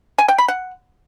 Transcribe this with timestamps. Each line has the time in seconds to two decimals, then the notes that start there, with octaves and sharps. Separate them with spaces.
0.18 G#5
0.28 G5
0.38 B5
0.48 F#5